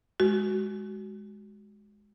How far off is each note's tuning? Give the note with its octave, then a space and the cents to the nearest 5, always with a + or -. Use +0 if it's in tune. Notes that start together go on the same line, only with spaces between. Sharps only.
G#3 +0 F#4 +20